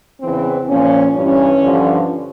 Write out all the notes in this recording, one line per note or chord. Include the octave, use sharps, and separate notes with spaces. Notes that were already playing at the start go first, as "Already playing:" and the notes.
E2 C#3 E3 C4
A#2 F3 C#4
G2 E3 C#4
G2 D3 F3